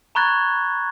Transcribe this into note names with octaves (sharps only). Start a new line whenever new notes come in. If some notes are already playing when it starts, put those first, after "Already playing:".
A#5 B5 C#6 F#6 G#6 A6